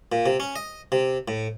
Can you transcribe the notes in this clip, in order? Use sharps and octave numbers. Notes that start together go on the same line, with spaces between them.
A#2
C3
C#4
D#5
C3
A2